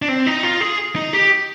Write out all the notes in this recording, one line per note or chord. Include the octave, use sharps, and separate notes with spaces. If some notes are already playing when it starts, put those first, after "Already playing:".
D4
C4
D#4
F4
G#4
D#4
G4